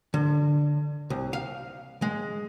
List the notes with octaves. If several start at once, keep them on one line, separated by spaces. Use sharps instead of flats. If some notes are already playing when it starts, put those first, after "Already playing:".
D3
C2
F5
G#3